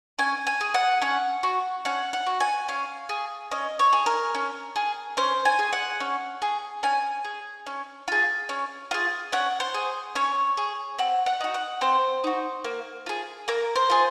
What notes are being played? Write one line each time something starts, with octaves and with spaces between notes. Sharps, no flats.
C#4 G#5
G#5
G#4
F#5
C#4 F#5
F#4
C#4 F#5
F#5
F#4
G#5
C#4 F5
G#4
C#4 D#5
C#5
G#4
A#4
C#4
G#4
C#4 C5
G#5
G#4
F#5
C#4
G#4
C#4 G#5
G#4
C#4
F4 G#4
C#4
F4 G#4
C#4 F#5
C5
G#4
C#4 C#5
G#4
C4 F#5
F#5
D#4 F#4
F#5
C4 C5
D#4 F#4
A#3
F4 G#4
A#3 A#4
C5
F4 G#4